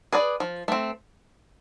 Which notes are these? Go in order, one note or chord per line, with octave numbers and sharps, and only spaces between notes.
G#4 B4 D5
F3
A3 C4